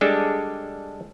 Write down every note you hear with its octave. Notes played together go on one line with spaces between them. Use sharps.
G3 G#3 D4 A4